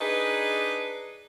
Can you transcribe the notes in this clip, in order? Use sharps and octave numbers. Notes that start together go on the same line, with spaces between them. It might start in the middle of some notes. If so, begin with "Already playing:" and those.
D4 D#4 G#4 B4